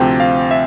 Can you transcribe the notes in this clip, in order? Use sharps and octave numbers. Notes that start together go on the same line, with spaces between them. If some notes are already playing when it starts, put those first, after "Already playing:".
Already playing: D2 C3 F3 C4 G5
F5
E5